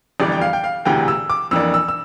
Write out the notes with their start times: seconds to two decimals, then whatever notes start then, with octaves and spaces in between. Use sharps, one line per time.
0.20 G1 F2 E3 G3 D4 D5
0.32 G5
0.41 F5
0.53 G5
0.64 F5
0.85 E1 D2 C3 E3 G5
1.08 E6
1.30 D6
1.51 F2 E3 A#3 D4 E6
1.74 E6
1.88 E6